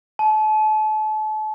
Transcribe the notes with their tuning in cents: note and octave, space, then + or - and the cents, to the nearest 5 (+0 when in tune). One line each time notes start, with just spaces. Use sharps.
A5 -35